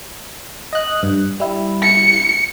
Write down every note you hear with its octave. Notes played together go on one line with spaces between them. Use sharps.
D#5 F#6
G2
G3 E4
C#7